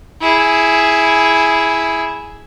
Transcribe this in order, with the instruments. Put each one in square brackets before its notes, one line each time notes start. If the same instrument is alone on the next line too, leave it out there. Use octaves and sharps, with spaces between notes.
[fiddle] E4 G#4